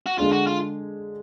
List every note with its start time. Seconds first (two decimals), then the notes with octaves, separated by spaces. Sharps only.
0.06 F#4
0.18 D3 G#3 D4 F4 G#4
0.32 F#4
0.47 F4